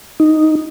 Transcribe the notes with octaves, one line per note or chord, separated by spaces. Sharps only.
D#4